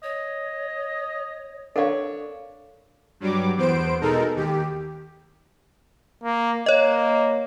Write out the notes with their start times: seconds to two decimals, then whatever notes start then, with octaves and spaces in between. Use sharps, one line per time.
0.03 C#5 D#5
1.76 D4 A4 A#4 C#5 F5
3.20 G2 F#3 G3 D6
3.56 E2 B3 C5 D7
4.01 B2 G#3 D#4 A4 A#4
4.35 D#2 G4
6.24 A#3
6.66 A#3 C#5 D#5